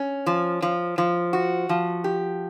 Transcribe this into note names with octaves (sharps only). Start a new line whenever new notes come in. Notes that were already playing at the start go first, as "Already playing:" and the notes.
Already playing: C#4
F3
F3
F3
F#4
F3
G4